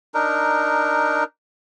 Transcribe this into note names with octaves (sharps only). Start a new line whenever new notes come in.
D4 D#4 A#4